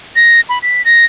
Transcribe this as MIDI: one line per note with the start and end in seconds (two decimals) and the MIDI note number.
0.16 0.41 94
0.49 0.59 83
0.62 0.85 95
0.85 1.05 94